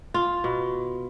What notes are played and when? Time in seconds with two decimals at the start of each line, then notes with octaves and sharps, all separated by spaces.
0.14 F4
0.44 B2